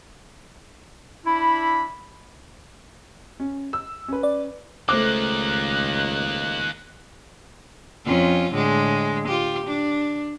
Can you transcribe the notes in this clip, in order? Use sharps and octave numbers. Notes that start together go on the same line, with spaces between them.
D4 E4 E5 B5
C#4
E6
C#4 B4
D5
C#2 D#3 A3 A#3 C5 D6 F#6
F2 C#4 F4
A2 D3 G#3
F4 G4
D4